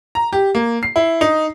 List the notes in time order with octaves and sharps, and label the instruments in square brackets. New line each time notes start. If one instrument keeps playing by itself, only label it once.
[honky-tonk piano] A#5
G4
A#3
C7
E4
D#4